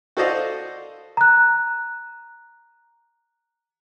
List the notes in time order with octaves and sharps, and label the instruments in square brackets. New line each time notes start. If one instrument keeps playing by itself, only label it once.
[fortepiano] F#4 A4 C5 D5 D#5 F5
[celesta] A#5 F#6